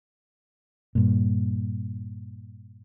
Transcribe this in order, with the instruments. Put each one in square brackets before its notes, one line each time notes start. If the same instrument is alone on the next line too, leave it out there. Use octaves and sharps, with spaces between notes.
[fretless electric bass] G2 A#2